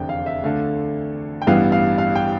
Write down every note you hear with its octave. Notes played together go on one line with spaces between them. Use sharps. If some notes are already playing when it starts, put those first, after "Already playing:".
Already playing: F1 E2 D3 G5
F5
E5
D2 D3 A3 F5
G5
A1 G2 E3 G3 B3 F5
F5
F5
G5